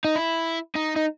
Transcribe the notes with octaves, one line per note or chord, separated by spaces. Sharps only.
D#4
E4
D#4
D#4